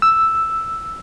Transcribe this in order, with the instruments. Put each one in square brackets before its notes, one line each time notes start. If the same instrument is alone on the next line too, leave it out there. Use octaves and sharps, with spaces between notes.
[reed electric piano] E6